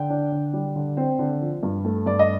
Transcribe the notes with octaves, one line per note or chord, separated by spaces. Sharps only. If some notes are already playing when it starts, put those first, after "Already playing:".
Already playing: D3 G5
D4
D3
G3
D3
C4
D3
F3
G2
A3
G2 D5
D#5